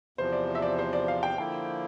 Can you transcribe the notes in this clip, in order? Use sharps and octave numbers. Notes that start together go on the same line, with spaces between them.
E2 C3 F3 C5
D5
E5
D5
C5
D5
F5
G5
D3 F3 A#3 E4 G5